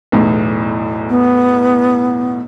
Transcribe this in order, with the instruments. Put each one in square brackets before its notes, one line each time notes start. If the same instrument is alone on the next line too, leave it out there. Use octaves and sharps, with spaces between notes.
[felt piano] B1 E2 A2
[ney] B3